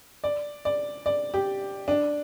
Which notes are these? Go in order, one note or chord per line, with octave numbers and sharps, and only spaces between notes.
D5
D5
D5
G4
D4